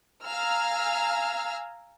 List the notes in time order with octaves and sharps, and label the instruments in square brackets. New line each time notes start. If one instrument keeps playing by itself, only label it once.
[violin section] F5 G#5 A#5 E6 F6